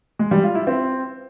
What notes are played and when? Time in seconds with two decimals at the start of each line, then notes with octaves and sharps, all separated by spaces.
0.19 G#3
0.31 G3
0.43 F4
0.55 E4
0.67 C4